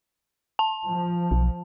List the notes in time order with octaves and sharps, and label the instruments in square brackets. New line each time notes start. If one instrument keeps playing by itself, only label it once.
[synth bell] A5
[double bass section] F3
[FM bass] B1